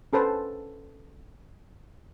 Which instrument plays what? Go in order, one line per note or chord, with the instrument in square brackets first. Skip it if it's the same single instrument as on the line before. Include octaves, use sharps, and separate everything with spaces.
[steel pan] C#4 A4 B4 C5 A5